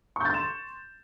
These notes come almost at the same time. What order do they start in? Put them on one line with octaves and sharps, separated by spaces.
C#6 G6 A6 C6 E7